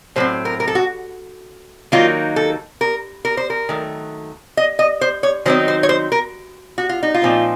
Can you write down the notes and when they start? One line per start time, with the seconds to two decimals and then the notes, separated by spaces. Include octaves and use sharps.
0.16 A2 F#3 C4 C5
0.45 A#4
0.60 A#4
0.68 A4
0.75 F#4
1.92 D#3 F#3 A#3 D#4 F4
2.36 A4
2.81 A#4
3.25 A#4
3.37 C5
3.50 A#4
3.69 D#3 F#3 A3
4.57 D#5
4.79 D#5
5.01 C5
5.23 C#5
5.45 D#3 F#3 C4 D#4 C5
5.68 C5
5.83 C#5
5.89 C5
6.12 A#4
6.78 F#4
6.89 F4
7.03 D#4
7.14 F4
7.22 A#2 F3 C4 D#4